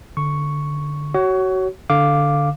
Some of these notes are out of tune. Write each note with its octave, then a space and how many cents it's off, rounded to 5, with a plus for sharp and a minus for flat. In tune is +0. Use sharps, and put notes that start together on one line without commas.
D3 +0 C#6 +0
F#4 +25 C#5 +0
D3 +0 F5 +0 D6 +0